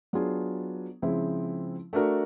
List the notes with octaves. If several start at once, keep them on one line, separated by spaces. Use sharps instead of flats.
F#3 B3 D4 F4 G#4
C#3 F3 G#3 C4 E4
A3 D4 F#4 A#4